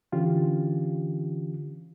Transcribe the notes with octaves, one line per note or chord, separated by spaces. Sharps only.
D3 E3 C#4 F4 G4